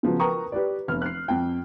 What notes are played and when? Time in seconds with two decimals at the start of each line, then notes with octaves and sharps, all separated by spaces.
0.03 C#3 F3 F#3 B3
0.20 A#4 B4 G5 A#5 C#6 D#6
0.52 G4 B4 D5
0.88 F1 B3 F6
1.02 F#6 C7
1.28 F2 G5